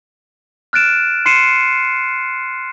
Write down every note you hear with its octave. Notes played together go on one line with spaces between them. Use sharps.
F6 F#6 A6 D7 E7
C6 C7 C#7 D#7 E7